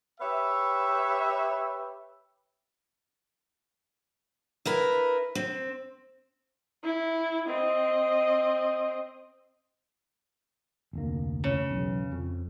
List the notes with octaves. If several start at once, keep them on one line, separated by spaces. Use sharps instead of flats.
G4 B4 C#5 E5
E4 A#4 B4
C4
E4
C4 D#5
F1 D2 A#3
C#3
B1 E2
F2